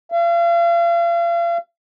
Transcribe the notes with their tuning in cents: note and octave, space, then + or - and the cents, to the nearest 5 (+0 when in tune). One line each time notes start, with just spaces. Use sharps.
F5 -40